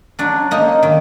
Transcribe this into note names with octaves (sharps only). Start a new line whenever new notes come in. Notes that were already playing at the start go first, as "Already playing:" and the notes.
F#3 D4
A#3 D#4
D#3